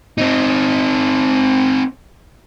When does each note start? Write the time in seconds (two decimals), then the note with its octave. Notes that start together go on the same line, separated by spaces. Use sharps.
0.18 C4 D#4